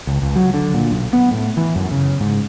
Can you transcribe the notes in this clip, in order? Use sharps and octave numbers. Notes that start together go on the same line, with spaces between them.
C#2
C#2
F#3
D3
A#2
B1
B3
A2
E3
F#2
C#3
G#2